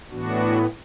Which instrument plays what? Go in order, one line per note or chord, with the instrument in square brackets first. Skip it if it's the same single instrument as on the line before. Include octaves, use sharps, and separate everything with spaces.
[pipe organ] A2 E3 B3 D4 F#4